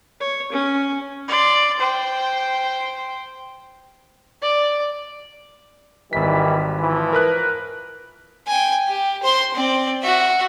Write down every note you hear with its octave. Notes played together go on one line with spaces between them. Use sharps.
C#5
C#4
D5 C6
C5 G5
D5
G#1 D#3 E3 G3 B6
E3 F3
A#4 B4 F#6
G5 G#5
G4
C5 C6
C4 D5
F#4 E5